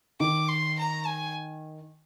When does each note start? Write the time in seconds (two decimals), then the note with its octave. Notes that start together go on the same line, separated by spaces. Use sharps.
0.20 D#3 D6
0.49 C6
0.79 A#5
1.07 G#5